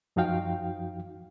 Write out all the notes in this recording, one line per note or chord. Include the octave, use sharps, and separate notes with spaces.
F#2 F3 D#4 F#4 F5 G5